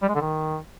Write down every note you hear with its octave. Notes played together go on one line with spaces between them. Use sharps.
G3
G#3
D3
D#3